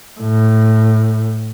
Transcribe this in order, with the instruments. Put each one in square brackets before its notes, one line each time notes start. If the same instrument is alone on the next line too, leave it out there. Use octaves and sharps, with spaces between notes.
[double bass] A2